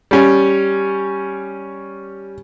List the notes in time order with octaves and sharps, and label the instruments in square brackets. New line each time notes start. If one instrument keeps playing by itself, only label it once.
[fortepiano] G3 C#4